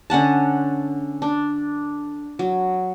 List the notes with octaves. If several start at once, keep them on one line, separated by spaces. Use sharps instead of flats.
D3 C#4 F#5 A5
D4
F#3